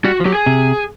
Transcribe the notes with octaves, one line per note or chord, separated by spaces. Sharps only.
G3 F#4
F3
F#3 G4
G#4
C3